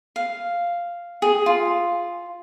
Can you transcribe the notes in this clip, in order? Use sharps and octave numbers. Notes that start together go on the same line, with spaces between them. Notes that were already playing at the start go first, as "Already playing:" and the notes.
F5
G#4
F4